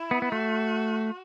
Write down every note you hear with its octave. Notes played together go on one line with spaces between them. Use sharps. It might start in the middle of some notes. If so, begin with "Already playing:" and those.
Already playing: E4
B3
B3
A3 F#4